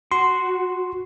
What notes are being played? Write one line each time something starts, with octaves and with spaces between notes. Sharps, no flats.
F#4 C6